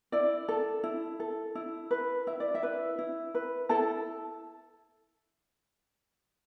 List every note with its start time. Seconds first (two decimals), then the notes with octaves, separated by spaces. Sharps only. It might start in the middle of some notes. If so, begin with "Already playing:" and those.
0.12 E4 D5
0.49 A4
0.84 E4
1.20 A4
1.55 E4
1.91 B4
2.27 E4 E5
2.40 D5
2.54 E4 E5
2.63 B4
2.99 E4
3.35 B4
3.69 E4 A4 A5